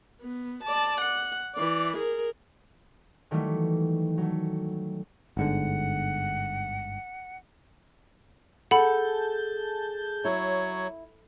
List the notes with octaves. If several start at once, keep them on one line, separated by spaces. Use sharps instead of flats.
B3
D5 A5
F#5
E3 D5
G#4 A#4
D#3 E3 F#3 G3 A3
F#3 A3
G1 G#2 D3 F#5
G#4 A4 F#5 A5 B5 G6
F#3 E4 C#5